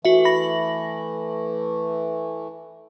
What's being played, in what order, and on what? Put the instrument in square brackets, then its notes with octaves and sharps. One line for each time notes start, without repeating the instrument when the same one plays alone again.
[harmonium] E3 A3 [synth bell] F#4 E5
[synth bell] B5 A#6 F#7